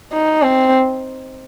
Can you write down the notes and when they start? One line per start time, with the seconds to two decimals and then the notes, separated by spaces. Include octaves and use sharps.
0.13 D#4
0.42 C4